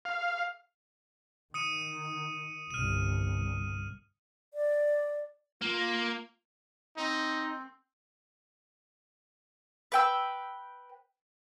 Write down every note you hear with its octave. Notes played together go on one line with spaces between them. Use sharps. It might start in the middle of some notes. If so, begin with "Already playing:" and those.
F5
D#3 D#6 C#7 D#7
G1 C2 F6 D#7
D5
A#3 F4
C4 D#4
B4 G5 E6